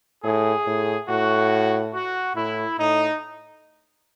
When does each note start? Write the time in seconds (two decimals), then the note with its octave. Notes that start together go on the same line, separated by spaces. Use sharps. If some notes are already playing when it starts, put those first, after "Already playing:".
0.24 A2 G#4
0.67 A2
1.09 A2 F#4
1.94 F#4
2.35 A2 E4
2.79 A2 D#4